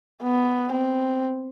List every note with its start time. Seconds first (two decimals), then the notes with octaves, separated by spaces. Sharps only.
0.23 B3
0.72 C4